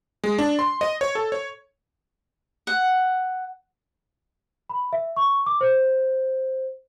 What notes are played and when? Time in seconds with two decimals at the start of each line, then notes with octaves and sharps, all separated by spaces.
0.24 G#3
0.39 D4
0.59 C6
0.81 D#5
1.01 C#5
1.15 A4
1.32 C#5
2.67 F#5
4.69 B5
4.93 E5
5.16 C#6
5.46 D6
5.61 C5